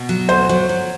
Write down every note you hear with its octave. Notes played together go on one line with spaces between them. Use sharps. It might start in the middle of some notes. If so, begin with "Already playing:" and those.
Already playing: B2
F#3
D2 C5
F#3
F#3